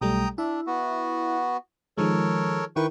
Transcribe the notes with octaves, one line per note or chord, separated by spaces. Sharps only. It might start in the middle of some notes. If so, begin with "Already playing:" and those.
B1 G3 A3 G5 A#5 D#6
D4 E4 E5
B3 F#4
D#3 F3 G#3 A4 A#4 C#5
D#3 E4 A#4 B4 G5 C#6